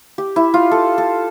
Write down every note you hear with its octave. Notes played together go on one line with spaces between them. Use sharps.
G4
E4
F4
A4
A4